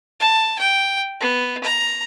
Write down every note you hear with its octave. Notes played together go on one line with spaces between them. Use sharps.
A5
G5
B3
A#5